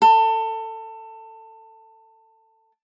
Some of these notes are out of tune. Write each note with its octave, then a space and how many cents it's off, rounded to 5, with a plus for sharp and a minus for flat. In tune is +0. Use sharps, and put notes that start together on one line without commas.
A4 +20